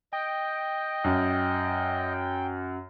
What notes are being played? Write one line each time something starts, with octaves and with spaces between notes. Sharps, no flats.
D#5 G5
F#2